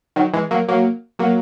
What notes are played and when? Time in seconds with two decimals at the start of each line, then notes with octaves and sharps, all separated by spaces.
0.16 D#3 F#3
0.33 E3 G#3
0.51 F#3 A#3
0.68 F#3 A#3
1.19 F#3 A#3